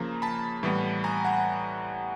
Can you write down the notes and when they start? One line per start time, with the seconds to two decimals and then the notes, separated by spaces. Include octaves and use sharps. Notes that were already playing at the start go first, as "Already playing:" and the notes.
Already playing: C#3 F3 A#3 A#5
0.22 A5 B5
0.63 A2 E3 G3 B3
1.04 G#5 A#5
1.25 F#5 G#5